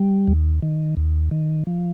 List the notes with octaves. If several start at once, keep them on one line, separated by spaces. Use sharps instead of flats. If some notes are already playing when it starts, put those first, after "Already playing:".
Already playing: G3
D#2
D#3
D#2
D#3
F3